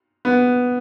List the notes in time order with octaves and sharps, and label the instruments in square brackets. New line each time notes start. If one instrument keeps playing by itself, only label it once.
[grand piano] B3